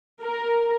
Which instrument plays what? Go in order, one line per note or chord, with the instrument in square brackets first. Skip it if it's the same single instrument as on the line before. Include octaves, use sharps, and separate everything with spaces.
[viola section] A#4